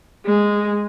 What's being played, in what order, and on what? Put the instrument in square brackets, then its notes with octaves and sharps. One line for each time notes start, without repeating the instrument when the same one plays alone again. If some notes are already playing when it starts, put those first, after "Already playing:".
[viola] G#3